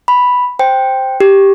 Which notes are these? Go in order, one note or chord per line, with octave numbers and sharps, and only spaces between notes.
B5
C5 G5
G4